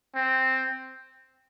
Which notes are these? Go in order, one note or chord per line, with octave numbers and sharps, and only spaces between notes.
C4